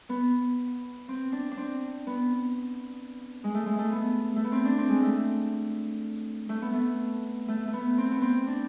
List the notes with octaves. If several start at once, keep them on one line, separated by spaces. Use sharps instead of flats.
B3
C4
D4
D4
C4
B3
G#3
A3
G#3
A3
B3
A3
B3
C4
D4
C4
G#3
A3
A3
B3
A3
A3
A3
B3
C4
B3
C4
D4